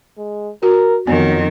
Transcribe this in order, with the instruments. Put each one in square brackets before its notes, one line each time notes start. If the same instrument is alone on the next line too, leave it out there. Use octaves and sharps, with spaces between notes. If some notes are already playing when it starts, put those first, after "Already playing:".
[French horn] G#3
[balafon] F#4 [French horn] A#4
[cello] F2 D#3 [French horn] F#3 [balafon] B3